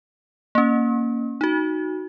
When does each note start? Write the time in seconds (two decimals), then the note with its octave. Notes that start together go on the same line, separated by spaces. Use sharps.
0.55 A#3 C#4
1.41 D#4 F#4